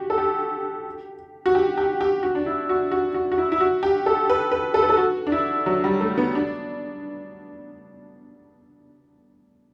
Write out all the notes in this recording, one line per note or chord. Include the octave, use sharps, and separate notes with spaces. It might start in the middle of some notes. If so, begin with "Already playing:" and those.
Already playing: F#4 G4
A4
G4
F#4
G4
G4
G4
F#4
D4
E4
F#4
F#4
F#4
F#4
E4
E4
F#4
G4
A4
B4
B4
A4
B4
A4
F#4
D4
E4
F#3
G3
A3
B3
D4